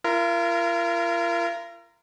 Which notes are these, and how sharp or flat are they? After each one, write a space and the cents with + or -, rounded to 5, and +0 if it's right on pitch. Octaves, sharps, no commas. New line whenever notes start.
F4 -40 A#4 +0